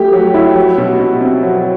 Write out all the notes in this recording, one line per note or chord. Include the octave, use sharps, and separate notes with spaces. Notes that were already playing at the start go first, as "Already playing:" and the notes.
Already playing: F#3 A3 G4
F#3
E4
F#3
B2
B2
C4
F#3